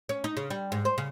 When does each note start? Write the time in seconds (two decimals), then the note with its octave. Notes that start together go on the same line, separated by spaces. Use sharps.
0.09 C#4
0.24 D#4
0.37 C#3
0.50 G3
0.72 G#2
0.85 C5
0.98 C#3